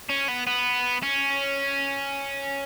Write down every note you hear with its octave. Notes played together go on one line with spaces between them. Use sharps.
C#4
B3
B3
C#4